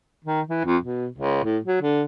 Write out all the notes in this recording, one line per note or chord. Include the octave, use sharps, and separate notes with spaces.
D#3
E3
F2
B2
C#2
A2
F#3
D3